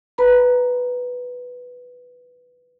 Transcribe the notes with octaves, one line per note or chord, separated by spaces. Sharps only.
B4 A#5 B5